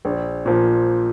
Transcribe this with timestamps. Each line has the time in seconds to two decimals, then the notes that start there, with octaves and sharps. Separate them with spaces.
0.05 A#1
0.46 A#2 F3